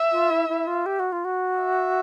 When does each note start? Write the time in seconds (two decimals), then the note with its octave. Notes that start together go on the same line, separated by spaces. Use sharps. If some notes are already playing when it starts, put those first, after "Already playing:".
Already playing: E5
0.12 F4
0.30 E4
0.49 E4
0.67 F4
0.86 G4
0.99 F#4
1.12 F4
1.25 F#4
1.60 E5